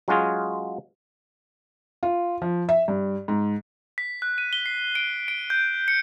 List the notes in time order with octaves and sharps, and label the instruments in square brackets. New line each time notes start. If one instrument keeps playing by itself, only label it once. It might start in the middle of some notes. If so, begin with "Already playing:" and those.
[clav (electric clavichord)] F#3 G#3 C#4 F4 F#4 G#4
[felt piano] F4
F3
E5
G2
G#2
[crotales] B6
F#6
D#7
G7
C7
D7
D7
G6
C#7